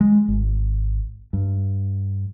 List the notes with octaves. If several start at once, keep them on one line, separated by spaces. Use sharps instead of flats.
G#3
G#1
G2